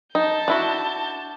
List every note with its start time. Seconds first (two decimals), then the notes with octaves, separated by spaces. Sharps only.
0.15 D#4 A5 G6
0.48 D4 E4 F#4